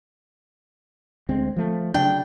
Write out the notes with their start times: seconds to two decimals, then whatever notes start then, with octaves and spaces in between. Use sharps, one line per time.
1.29 D2 G#3 C4
1.56 F3 A3
1.94 C#3 F#3 D4 G5